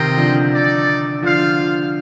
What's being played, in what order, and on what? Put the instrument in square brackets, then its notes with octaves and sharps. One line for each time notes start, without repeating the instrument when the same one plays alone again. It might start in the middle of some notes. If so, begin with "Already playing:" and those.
Already playing: [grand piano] C3 D#3 [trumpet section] C4 F4 C5 D#5 G5
[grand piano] D3 F3
[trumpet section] D#4 A4 D5
[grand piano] D3 F3 [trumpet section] F4 C5 F5